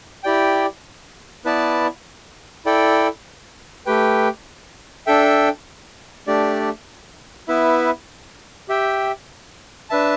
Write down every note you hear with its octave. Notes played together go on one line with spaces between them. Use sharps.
E4 G4 D5 G5
B3 E4 B4 D5 A5
E4 A4 D5 G5
A3 G4 B4 G5
D4 A4 E5 G5
A3 D4 G4 D5
B3 E4 B4 E5
G4 E5 G5
D4 B4 E5 A5